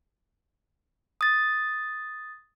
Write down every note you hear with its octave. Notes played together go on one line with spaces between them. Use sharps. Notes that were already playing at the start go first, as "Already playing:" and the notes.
D#6 A6